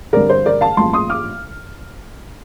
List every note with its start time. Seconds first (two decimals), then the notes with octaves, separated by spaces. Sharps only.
0.13 G2 D3 G3 C4 A#4 D5
0.29 C5
0.46 A#4 D5
0.61 F5 A5
0.77 A1 G2 F3 A#3 A5 C6
0.93 C6 D#6
1.10 D6 F6